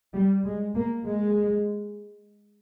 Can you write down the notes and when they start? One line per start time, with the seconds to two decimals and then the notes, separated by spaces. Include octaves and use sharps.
0.14 G3
0.45 G#3
0.75 A#3
1.05 G#3